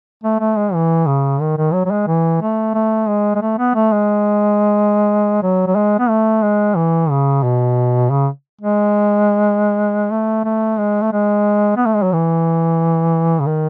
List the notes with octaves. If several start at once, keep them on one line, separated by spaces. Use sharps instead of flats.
A3
A3
G#3
E3
C#3
D#3
D#3
F#3
F#3
G#3
E3
A3
A3
G#3
G#3
A3
B3
A3
G#3
F#3
F#3
G#3
B3
A3
G#3
E3
C#3
B2
C#3
G#3
A3
A3
G#3
A3
G#3
B3
A3
G#3
F#3
E3
C#3
D#3